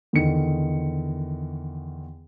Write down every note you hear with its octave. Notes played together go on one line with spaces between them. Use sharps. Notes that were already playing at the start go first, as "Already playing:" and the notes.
E2 D3 D#3 C#7